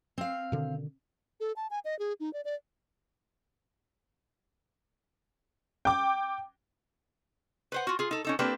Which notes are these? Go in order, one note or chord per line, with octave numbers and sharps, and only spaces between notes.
C4 F5
B2 D3 D#3
A4
A5
G#5
D#5
G#4
D#4
D5
D5
G5 D6
B4 C5 F#5
F4 F#4
F4 G#4
D#4 A4
C#4 D#4 A4
A#3 C4 D4 G4 A4 B4